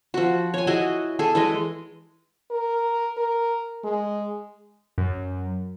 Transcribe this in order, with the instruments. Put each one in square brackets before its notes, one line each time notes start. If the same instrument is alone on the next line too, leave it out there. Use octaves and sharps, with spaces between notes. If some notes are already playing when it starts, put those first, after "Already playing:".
[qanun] F3 F#4
C#5 G#5
E4 F#4 G#4 D#5
G#4 A4
E3 G#3 D#5
[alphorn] A#4
A#4
G#3
[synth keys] F#2